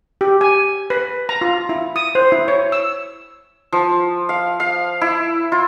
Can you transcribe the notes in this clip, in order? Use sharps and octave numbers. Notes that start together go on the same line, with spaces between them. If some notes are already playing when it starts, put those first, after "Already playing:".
G4
G#5
B4
A#5
F4
E4
D#6
C5
E4
C#5
E6
F3
F5
F5
E4
F4